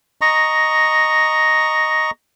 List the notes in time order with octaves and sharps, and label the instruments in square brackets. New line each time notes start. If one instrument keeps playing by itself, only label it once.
[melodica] D#5 A#5 C#6